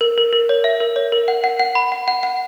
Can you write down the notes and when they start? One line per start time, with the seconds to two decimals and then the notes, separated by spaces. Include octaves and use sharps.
0.01 A#4
0.18 A#4
0.33 A#4
0.49 C#5
0.64 E5
0.80 A#4
0.96 C#5
1.12 A#4
1.28 F#5
1.44 F#5
1.59 F#5
1.75 B5
1.92 F#5
2.08 F#5
2.23 F#5